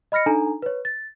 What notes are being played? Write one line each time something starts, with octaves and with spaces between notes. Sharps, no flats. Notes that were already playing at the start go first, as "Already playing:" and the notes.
D#5 B5 F6 A#6 C#7
D4 D#4 A4 G#5 A#5
B4 C#5
A6